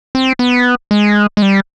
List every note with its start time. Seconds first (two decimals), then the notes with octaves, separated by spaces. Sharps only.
0.15 C4
0.39 B3
0.91 G#3
1.37 G#3
1.42 G3